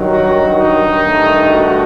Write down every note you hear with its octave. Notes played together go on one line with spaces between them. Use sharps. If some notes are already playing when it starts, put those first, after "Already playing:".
Already playing: G2 D#3 F#3
F#4
D#4
G2 D#3 A3
F#4